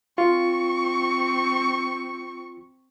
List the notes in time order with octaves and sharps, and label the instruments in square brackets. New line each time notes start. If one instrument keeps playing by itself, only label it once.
[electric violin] C4 C#6 [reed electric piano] F4